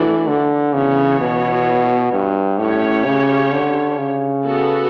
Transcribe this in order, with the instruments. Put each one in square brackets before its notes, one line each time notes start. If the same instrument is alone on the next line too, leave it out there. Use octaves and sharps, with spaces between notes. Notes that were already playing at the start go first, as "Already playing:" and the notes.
Already playing: [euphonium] E3 [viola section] A3 D4 F#4 A4 D5
[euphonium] D3
[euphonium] C#3 [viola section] E3 B3 F#4 C#5
[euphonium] B2
G2
[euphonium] A2 [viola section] C#4 G4 C#5
[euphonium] C#3
D3
C#3
[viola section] B3 F#4 A4